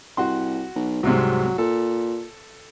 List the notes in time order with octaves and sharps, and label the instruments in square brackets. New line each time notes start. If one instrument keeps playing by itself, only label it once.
[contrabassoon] C2 [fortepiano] F#4 F#5 C6
[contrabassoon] B1
[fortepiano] C2 G#2 C3 [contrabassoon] F#3
[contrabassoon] A#2 [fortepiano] A4